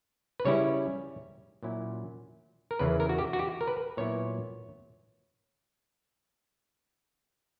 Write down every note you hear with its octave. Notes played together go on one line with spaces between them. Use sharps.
B4
C#3 G3 C#4 E4 C#5
A#2 F#3 C#4 E4
A#4
E2 C#3 E3 B4
A#4
F#4
G4
F#4
G4
A#4
B4
A#2 F#3 B3 E4 C#5